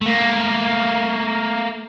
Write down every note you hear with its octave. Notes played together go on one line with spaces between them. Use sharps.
A3 A#3